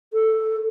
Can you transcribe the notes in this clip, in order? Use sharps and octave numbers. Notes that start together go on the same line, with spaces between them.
A4